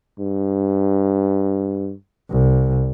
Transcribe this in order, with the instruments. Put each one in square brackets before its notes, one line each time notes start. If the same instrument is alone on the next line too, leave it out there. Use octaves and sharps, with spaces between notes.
[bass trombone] G2
[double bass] C2